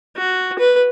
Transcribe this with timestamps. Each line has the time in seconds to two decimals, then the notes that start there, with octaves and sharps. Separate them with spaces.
0.17 F#4
0.59 B4